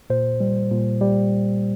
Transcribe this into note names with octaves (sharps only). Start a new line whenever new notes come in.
A#2 C5
G3
A#2
G3